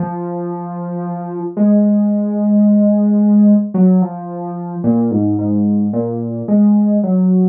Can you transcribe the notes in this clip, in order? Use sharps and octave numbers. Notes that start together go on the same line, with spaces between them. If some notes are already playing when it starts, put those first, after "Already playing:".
Already playing: F3
G#3
F#3
F3
A#2
G#2
G#2
A#2
G#3
F#3